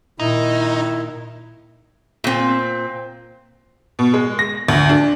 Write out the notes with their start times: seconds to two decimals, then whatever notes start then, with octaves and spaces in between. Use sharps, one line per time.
0.20 A#2 D#3 D#4 E4
2.24 A#2 C4
3.99 B2
4.14 G#3
4.39 A#6
4.68 D2
4.89 D4